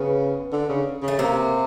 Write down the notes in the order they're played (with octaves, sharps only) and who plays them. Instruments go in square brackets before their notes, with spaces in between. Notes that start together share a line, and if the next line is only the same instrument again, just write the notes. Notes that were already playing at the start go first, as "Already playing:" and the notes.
Already playing: [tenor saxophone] C#3 [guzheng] B3
[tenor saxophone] D3
C#3
C#3
[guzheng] A3
[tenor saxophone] C3 [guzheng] A#3